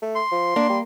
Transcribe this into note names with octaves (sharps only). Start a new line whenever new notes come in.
A3
C6
F3
A#3 D4
G3